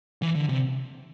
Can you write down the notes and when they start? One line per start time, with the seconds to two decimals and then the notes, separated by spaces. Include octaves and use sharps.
0.22 E3
0.35 D3
0.49 C3